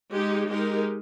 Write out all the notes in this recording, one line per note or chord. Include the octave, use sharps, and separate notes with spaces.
G#3 D#4 G4
G#3 D#4 G4 A#4